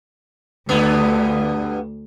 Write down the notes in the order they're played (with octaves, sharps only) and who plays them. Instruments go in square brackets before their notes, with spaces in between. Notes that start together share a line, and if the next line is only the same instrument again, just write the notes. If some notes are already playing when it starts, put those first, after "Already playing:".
[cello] D2 [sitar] G2 D3 B3